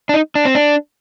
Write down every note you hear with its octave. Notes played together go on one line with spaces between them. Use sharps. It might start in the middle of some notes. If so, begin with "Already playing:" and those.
D4
D#4
D4
C4
D4